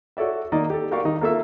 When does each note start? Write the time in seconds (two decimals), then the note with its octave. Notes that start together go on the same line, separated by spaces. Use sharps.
0.17 F#4 A4 C#5 D5 E5
0.52 D#3 A#3 D#4 D5 D#5
0.70 G4 A4
0.91 F#4 G4 A#4 D5 F5 C#6
1.05 D#3 D#4
1.21 A#3 F4 A4 A#4 E5 E6